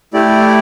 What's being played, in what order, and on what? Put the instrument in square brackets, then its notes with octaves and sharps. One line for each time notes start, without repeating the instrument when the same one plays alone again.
[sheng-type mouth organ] A3 E4 G4 D5